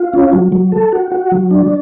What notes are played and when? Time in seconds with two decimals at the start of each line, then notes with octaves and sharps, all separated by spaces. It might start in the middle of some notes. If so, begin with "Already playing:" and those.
Already playing: F4
0.13 C#4
0.33 F#3
0.52 F#3
0.72 A4
0.92 F#4
1.12 F#4
1.32 F#3
1.51 D4